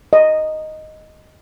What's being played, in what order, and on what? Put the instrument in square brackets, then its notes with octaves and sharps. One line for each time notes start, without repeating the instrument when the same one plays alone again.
[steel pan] D#5